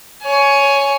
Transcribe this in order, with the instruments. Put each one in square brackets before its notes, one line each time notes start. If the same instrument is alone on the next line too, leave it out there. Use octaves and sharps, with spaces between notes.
[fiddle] C#5 G#5